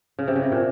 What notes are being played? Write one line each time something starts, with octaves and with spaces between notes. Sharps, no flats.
C#3
C3
C#3
C3
A#2